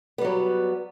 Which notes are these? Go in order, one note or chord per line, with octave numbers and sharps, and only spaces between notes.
F#3 G3 B3